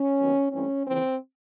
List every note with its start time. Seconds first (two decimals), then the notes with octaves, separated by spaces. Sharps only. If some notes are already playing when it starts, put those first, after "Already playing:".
Already playing: C#4
0.19 D#2 D#3 F#3 B3
0.52 G2 E3 A3 C4 C#4
0.87 D#2 C#3 E3 C4